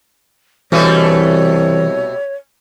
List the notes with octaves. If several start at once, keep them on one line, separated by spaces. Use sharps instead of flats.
C2 B2 E3 G3 A3 F#4 C#5 G#5